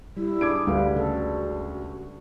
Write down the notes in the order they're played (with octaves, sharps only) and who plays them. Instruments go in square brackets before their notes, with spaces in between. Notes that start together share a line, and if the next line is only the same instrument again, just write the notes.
[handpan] G3 [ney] E4
[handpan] D4 G#4 [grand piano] D6 G#6 D7
[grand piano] D2 [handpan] G3 B4 [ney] F5
[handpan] C#3 A4 [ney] F#4